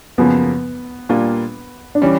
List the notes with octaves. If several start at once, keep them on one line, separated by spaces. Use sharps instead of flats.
F#2 C#3 F3 A#3 B3
A#2 G3 A#3 D4 F4
D4
E3 G3 C#4